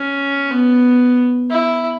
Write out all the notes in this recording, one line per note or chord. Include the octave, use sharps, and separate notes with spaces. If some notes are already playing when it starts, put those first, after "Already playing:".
Already playing: C#4
B3
E4